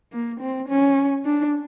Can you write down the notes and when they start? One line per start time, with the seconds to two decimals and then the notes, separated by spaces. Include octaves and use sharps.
0.13 A#3
0.41 C4
0.69 C#4
1.25 D4